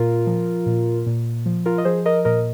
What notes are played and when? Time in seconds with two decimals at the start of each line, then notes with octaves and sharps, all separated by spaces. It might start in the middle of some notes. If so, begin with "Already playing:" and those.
Already playing: A#2 F4 A#4
0.27 F3
0.66 A#2
1.06 A#2
1.46 F3
1.66 F4 A#4
1.78 D#5
1.85 F3 G#4 C5
2.06 A#4 D#5
2.25 A#2 A#4 D#5